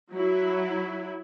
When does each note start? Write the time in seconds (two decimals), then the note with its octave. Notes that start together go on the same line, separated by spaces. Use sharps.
0.13 F#3 E4